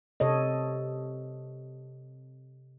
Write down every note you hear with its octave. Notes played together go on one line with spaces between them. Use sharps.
C3 A4 C#5 D#5